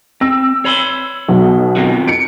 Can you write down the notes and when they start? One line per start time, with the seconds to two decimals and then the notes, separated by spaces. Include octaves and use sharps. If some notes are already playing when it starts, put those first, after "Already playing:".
0.21 C4 E6
0.65 C#5 B5 C6
1.28 B1 B2 F#3
1.76 C4 F4 F#4
2.07 C#7 D7